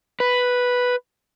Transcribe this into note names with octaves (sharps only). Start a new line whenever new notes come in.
B4